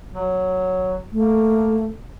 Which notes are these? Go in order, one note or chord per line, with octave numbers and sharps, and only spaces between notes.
F#3
A3 A#3